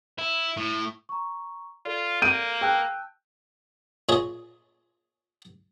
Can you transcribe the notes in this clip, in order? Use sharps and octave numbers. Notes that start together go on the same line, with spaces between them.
E4
A2
A#5 C#6
F4 A4 D5
A#3 G6 D7 D#7
G5 A5 E6 F#6
A#2 G#4 C#5 D#5